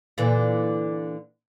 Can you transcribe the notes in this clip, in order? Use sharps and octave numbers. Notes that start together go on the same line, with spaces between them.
A#2 D3 E3